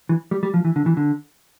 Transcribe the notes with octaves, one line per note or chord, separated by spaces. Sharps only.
E3
G3
G3
F3
E3
D3
E3
D3